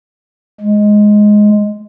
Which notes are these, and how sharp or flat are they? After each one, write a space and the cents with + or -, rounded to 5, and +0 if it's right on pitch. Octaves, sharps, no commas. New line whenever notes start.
G#3 +5